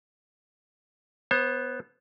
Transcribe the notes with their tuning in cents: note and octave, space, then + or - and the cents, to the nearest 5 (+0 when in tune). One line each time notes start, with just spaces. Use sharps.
B3 +0 C5 +40